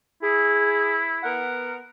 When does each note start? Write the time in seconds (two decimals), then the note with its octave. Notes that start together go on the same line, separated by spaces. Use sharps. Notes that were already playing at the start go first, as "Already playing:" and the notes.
0.23 E4 G#4
1.23 B3 A#4 F#5